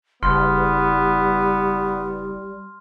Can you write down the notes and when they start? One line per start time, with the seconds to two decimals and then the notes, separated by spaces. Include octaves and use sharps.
0.23 F#1 G3 B3 C6 F6